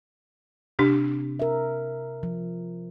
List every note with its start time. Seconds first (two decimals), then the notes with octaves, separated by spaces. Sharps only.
0.79 C3 D4 G4
1.39 A#4 E5
2.23 F3